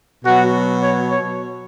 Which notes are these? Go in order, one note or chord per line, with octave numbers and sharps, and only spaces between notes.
B2 F#3 F#4
C#5
C#5